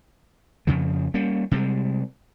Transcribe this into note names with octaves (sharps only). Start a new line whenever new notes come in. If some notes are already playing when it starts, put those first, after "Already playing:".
F2 C#3 F3
G3 A#3 C#4
C3 G3 G#3